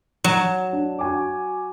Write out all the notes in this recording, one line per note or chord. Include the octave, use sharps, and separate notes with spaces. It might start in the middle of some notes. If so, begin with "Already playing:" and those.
F#3 E7
D4
F#4 G#5 D6